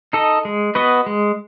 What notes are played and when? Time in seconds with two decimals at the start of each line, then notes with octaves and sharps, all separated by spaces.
0.13 D#4 A4 D#5
0.45 G#3
0.75 B3 F#4 B4 D#5
1.06 G#3